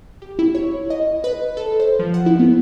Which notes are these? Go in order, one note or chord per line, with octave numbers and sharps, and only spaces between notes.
G4
E4
C#5
D#5
B4
A4
C5
F3
F#5
E4
B3